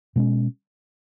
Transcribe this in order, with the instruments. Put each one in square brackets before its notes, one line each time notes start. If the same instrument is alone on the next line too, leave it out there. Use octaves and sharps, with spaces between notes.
[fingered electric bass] B2 G#3 C#4